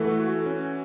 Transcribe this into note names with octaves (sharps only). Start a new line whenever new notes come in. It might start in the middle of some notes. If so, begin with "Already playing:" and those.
Already playing: E3 A3 F#4
F#4
C#4